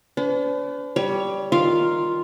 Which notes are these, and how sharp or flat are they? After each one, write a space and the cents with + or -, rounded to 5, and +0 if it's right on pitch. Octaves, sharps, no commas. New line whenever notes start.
D4 -45 B4 +40
G3 +0 C#5 +20
D#3 +0 F4 +0 F5 -5